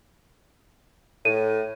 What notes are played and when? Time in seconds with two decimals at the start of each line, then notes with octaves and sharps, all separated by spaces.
1.25 A2 D#7